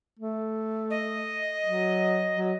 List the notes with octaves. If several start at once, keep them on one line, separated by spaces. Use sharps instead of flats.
A3
D#5
F#3
F#3